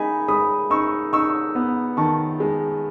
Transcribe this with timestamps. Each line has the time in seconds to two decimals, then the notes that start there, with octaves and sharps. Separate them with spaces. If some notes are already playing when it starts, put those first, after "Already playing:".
Already playing: G#3 D#4 G#5 B5
0.28 G#3 B5 D#6
0.70 D#4 C#6 E6
1.13 D#4 C#6 E6
1.55 B3
1.97 D#3 A5 C#6
2.40 G#3